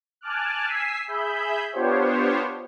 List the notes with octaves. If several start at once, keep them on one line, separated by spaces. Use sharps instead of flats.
G#5 A5 D6 F6 F#6
G#5 E6 B6 C7
G#4 E5 B5 G6
B3 D4 F4 G4 C5 C#5